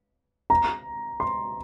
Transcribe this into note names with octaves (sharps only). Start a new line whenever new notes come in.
A#5
C6